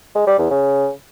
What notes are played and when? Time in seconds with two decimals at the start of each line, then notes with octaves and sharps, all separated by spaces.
0.15 G#3
0.27 G3
0.38 E2
0.50 C#3